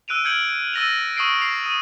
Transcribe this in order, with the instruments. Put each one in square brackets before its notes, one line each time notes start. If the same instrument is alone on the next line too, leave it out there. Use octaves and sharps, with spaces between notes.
[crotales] E6 F#6 D7 D#7 F7
F6 G6 G#6 C#7 D7 F#7
E6 A6 A#6 D#7 F7
C#6 D#6 E6 C7 D7 D#7
C7 F7
D#6 D#7